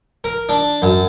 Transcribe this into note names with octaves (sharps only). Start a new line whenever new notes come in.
A#4
D4
F#2